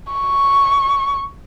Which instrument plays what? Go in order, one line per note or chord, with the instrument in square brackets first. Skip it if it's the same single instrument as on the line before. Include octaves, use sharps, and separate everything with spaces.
[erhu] C#6